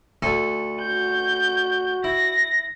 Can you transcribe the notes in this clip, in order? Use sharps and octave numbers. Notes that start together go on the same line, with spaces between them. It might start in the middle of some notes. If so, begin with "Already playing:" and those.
D2 A4 G#5
F#4 G6
E4 A#6